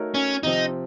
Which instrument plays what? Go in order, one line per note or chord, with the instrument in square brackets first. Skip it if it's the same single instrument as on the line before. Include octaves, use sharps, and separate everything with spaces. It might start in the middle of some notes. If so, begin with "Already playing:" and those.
Already playing: [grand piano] A3 D#4 F#4 A#4 C#5
[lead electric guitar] C#4
[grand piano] C3 F3 C4 [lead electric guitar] D#4